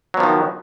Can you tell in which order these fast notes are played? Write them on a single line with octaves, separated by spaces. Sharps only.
F#3 B2 F3 D#3